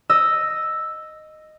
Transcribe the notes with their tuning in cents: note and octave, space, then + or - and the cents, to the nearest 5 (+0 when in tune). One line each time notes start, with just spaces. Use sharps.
D#5 -5 E6 +0